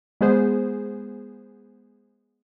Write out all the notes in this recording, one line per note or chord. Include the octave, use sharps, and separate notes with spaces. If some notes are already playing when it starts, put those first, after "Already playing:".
G#3 B3 G#4 C5